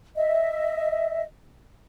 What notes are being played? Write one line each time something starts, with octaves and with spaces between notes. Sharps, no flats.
D#5 E5